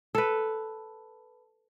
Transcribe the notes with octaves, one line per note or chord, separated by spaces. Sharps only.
A4 B4